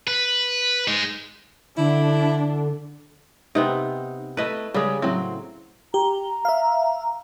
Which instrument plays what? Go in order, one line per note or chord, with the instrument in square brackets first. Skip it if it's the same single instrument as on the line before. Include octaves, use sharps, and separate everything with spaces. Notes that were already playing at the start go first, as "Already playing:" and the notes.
[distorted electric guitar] B4
G#3 D#4
[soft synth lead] D3 [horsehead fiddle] D4 [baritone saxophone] E4
[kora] C3 B3 C4 [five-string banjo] D#4
[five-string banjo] A3 E4 [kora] B4 D#5
[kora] C#3 [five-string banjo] G3 G#3
[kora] A2 [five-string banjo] F#3 C4
[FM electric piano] G4 [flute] A#5
[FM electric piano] E5 F5